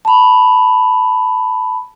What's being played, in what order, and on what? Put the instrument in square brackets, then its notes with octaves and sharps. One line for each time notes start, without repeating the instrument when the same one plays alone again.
[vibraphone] A5 B5